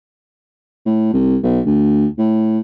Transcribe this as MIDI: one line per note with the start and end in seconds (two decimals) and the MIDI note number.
0.86 1.08 45
1.13 1.38 36
1.43 1.60 35
1.66 2.06 38
2.18 2.59 45